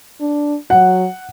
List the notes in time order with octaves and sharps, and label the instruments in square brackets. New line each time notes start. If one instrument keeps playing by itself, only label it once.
[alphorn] D4
[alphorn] F#3 [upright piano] F#5